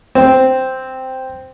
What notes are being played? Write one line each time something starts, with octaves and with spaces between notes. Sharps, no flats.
C4